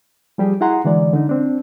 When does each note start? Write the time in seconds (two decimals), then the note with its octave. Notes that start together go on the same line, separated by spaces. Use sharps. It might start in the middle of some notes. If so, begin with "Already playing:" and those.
0.38 F3 G3 G4 G#4
0.61 E4 F#4 G#4 F#5 A#5 C6
0.85 D3 E3 G#3 D5
1.13 D3 D#4
1.29 C4 D4